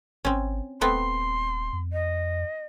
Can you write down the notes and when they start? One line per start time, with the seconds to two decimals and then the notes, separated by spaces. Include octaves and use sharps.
0.25 G#1 C4 C#4
0.81 D#1 A3 B3 C4 C6
1.73 F2
1.93 D#5